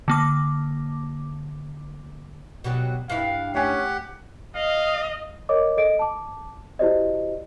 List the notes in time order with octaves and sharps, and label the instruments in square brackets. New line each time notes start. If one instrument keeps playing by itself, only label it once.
[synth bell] D3 A#3 D6
[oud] B2 F#3 G3
[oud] G2 E4 [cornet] F5
[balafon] A3 G#5 [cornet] C#4 [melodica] G4 F#5
[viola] D#5 [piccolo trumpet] F5
[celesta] A#4 C#5 D#5 D6
A4 D#5 D7
A5 D6
E4 F#4 G4 C5 D5 D#5